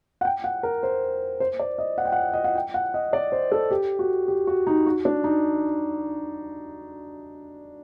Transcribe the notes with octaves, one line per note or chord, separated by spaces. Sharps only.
F#5
G5
F#5
A#4
C5
C5
D5
D#5
F#5
G5
F#5
D#5
F#5
G5
F#5
D#5
D5
C5
A4
G4
F#4
G4
F#4
D#4
F#4
D4
D#4